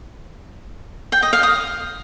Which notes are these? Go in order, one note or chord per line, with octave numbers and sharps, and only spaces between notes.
G5
D#5
F5
D#6